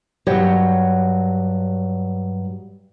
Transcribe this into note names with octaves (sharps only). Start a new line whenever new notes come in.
G2 F#3 G4 C#5